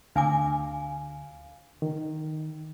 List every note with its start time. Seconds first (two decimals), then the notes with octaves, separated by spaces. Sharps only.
0.16 D2 D4 F5 G#5 D6
1.82 D#3